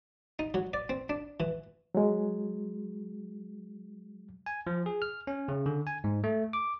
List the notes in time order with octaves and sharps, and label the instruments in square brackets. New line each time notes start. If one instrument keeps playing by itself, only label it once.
[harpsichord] D#4
F#3
D5
C4
D4
E3
[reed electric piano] F#3 G#3
[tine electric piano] G#5
F3
G#4
F6
C#4
C#3
D3
G#5
G#2
A3
D6